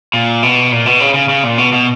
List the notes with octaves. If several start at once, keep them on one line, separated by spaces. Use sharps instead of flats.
A#2
B2
A#2
B2
C#3
C#3
C#3
A#2
B2
B2